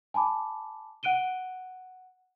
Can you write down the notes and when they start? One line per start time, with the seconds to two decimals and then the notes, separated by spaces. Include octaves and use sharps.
0.14 G#5 A5 B5 D6
1.03 F#5 F#6 D7 D#7 G7